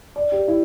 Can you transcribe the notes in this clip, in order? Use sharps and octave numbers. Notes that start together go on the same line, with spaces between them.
D5
G4
E4